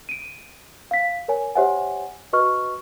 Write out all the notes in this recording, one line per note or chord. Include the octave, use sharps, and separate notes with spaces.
D7 D#7
F5 B6
A#4 C#5 G#5
G4 C5 C#5 E5 F#5 G#5
F#4 B4 D#5 C#6 F6